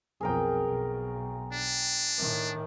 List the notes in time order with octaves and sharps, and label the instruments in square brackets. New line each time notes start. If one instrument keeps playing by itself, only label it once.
[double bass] B1 F2 [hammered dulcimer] G#4 A#4 G5
[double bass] B1
[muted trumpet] D4
[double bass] A2 D#3